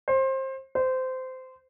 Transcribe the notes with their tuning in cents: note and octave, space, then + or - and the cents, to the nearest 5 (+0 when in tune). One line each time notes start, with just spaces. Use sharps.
C5 +25
C5 -20